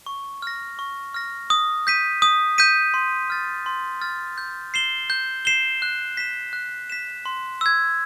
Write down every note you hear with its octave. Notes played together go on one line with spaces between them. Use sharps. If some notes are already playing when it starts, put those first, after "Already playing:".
C#6
F6 A#6
C#6
F6 A#6
D#6
G6 B6 D#7
D#6
G6 B6 D#7
C6
F6 A6
C6
F6 A6
G6
C7 E7 G7
G6
C7 E7 G7
F#6
B6 E7
F#6
B6 E7
C6
E6 G#6